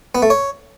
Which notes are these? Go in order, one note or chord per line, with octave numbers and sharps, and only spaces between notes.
B3
A3
C#5